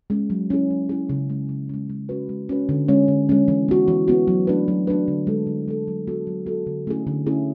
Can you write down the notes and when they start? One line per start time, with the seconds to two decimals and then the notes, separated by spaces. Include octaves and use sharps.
0.10 G#3 C#4
0.30 F#3
0.50 C#4 E4 G#4
0.71 F#3
0.89 C#4 E4 G#4
1.09 C#3
1.29 G#3 C#4
1.49 C#3
1.69 G#3 C#4
1.90 G#3
2.09 C#4 F#4 B4
2.29 G#3
2.49 C#4 F#4 B4
2.69 D3
2.88 G#3 C#4
3.08 D3
3.29 G#3 C#4
3.48 E3
3.68 B3 F#4
3.88 E3
4.08 B3 F#4
4.28 F#3
4.47 A3 D4 F#4 B4
4.68 F#3
4.87 A3 D4 F#4 B4
5.08 D3
5.27 G#3 D4 A4
5.47 D3
5.68 G#3 D4 A4
5.88 F#3
6.07 B3 F#4 A4
6.27 F#3
6.46 B3 F#4 A4
6.67 D3
6.87 A3 C#4 E4 G#4
7.07 D3
7.26 A3 C#4 E4 G#4